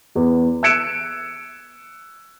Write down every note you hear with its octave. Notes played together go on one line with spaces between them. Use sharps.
E2
E6 F#6 G#6 C#7 D7 E7